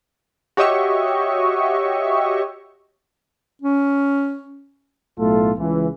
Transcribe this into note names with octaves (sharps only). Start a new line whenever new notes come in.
F#4 G4 C#5 D#5 E5 C#6
C#4
B1 A2 A3 F4 A4
C#2 E3